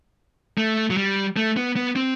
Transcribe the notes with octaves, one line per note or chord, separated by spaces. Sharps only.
A3
F#3
G3
A3
B3
B3
C4